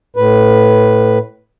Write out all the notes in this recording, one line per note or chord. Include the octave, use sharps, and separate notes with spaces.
A2 B4